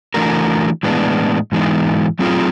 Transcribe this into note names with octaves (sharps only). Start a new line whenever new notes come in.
E3 A3 D4 F#4 A#4
A2 E3 G#3 B3 D4
G#2 E3 G#3 B3 D#4
F#3 A3 C4 F4 G#4